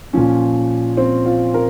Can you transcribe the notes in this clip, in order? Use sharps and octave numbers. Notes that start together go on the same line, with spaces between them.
A#2 F3 C#4
C4
F4
A#4